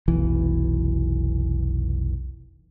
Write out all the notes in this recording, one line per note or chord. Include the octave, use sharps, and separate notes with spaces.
F1 B1 E3